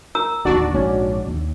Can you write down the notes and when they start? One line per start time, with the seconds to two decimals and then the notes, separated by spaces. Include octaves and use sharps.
0.15 A#4 A#5 E6
0.45 D1 D#2 D4 F#4 D5
0.74 A#1 G#2 C#4
1.27 D#2